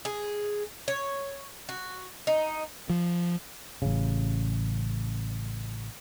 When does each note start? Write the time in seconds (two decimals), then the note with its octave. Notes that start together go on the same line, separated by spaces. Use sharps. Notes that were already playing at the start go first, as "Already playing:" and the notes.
0.05 G#4
0.88 C#5
1.69 F#4
2.27 D#4
2.90 F3
3.82 A1 C#3